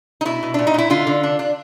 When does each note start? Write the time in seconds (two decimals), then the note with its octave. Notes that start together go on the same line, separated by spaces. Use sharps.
0.21 D#4
0.25 B2 E4
0.43 B2
0.54 A#2 D4
0.67 D#4
0.74 A#2 E4
0.90 D3 F4
1.07 D3
1.23 D4
1.39 D4